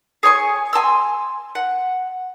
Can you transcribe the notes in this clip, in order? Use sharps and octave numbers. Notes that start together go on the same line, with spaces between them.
G#4 C#5 G#5 C#6
G#5 A5 C6 E6
F#5